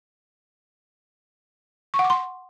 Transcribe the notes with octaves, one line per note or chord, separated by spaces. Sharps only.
C#6
F#5
D6
C6